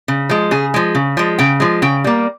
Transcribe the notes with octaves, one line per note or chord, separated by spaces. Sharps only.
C#3
F3 G#3
C#3 G#4
F3 G#3
C#3
F3 G#3
C#3 G5
F3 G#3
C#3 G5
G3 A#3